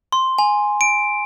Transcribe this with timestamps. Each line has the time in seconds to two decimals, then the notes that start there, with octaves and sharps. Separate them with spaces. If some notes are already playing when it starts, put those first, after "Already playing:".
0.12 C6
0.39 G#5
0.81 D7